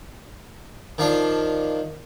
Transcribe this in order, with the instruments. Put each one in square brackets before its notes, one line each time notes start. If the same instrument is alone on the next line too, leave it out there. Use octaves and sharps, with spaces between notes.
[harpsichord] D#3 F3 D4 F5